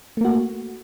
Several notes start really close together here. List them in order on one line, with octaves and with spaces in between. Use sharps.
A3 A#3 F#4